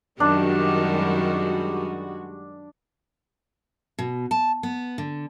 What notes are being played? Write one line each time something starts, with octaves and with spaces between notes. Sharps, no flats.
F#2 D#3 G3 G#3 D4 F#4
B2
A5
B3
D3